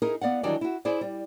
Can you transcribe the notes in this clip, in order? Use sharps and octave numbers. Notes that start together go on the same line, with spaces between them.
D#4 E4 G#4 A#4
B3 D5 F5 F#5
D#3 E3 F#3 G3 D4 D5
E4 F#4
E4 G#4 C5 D5
G3